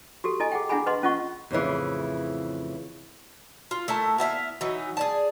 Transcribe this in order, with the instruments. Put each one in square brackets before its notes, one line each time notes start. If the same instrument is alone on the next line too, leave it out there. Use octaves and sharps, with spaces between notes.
[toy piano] F#4 G4 A4
E4 A4 D#5 G#5
G#4 F#5 G5
D4 E4 G#4 F#5 G#5 B5
B4 D#5 F#5 C6
C#4 F4 D#5 F#5 C#6
[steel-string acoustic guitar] F2 A2 C#3 E3
[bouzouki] F4
A3 E4 A#4 A5
B3 E4 E5 F5
E3 F#3 D#4
G#4 D5 A5